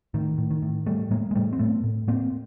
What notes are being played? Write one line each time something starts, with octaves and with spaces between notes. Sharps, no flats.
A2 D#3
A2
D#3
A2
A2 G3 A3
A2 G#3 A#3
G#3
A2 G3 A3
C4
A2 A3 B3
A2
A2 A#3 C4